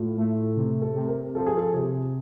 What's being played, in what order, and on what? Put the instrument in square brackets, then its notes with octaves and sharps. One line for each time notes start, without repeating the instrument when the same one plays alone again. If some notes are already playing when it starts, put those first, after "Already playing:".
Already playing: [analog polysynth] A2 [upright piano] F4
[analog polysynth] A3
C3
[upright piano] A4
[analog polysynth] C3
[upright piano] A#4
[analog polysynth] F3 [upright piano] A4
[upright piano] G#4
A4
[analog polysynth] C3 [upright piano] G#4